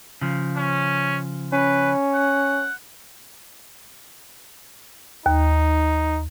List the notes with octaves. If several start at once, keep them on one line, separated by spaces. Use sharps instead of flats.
C#3 F3
C#4
C#4 B4
F#5
D#2 D#4